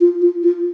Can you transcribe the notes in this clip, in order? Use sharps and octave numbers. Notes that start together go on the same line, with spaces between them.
F4
F4
F4